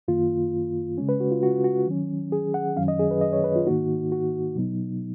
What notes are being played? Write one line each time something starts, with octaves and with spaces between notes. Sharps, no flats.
F#2 D#3 A#3 F4
C#3 G#3 C#4
B4
F#4
F4
F#4
F#4
D#3 F#3 C#4
G#4
F#5
F#2 D#3 F#3 C#4 F5
D#5
G#4
B4
D#5
C#5
B4
F4
G#2 D#3 A#3 D#4 F#4
F#4
B2 F#3 B3 D#4